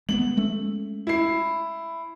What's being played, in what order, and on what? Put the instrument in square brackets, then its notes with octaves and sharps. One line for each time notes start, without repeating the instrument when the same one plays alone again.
[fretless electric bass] G#3 A#3 B3 [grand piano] F#7
[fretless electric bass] G#3 A3 C#4
[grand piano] E4 C7